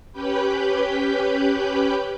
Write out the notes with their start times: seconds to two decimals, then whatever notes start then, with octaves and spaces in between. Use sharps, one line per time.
0.12 C#4 G4 B4 B5 G6